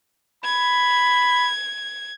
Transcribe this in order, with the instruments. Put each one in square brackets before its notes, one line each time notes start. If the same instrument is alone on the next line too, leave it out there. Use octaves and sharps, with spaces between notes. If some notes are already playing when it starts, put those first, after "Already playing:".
[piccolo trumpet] B5 [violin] G#6